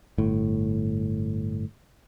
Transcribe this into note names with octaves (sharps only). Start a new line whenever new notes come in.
G1 A2